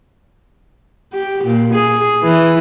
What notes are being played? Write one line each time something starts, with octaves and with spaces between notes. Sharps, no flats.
G4
A#2
G#4
E3